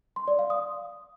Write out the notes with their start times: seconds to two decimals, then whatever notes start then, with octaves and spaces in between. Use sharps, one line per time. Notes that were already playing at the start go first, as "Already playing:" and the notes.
0.16 C6
0.28 D5
0.39 F5
0.50 D#6